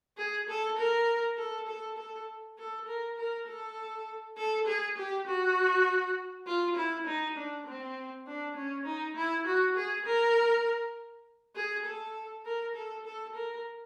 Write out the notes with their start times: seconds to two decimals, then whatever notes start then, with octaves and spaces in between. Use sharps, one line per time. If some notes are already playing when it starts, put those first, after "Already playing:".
0.18 G#4
0.49 A4
0.78 A#4
1.37 A4
1.68 A4
1.98 A4
2.58 A4
2.88 A#4
3.18 A#4
3.48 A4
4.37 A4
4.67 G#4
4.97 G4
5.27 F#4
6.47 F4
6.76 E4
7.06 D#4
7.37 D4
7.67 C4
8.27 D4
8.56 C#4
8.85 D#4
9.16 E4
9.47 F#4
9.76 G#4
10.06 A#4
11.56 G#4
11.85 A4
12.45 A#4
12.75 A4
13.06 A4
13.35 A#4